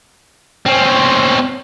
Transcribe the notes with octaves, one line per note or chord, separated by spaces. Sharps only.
C4 C#4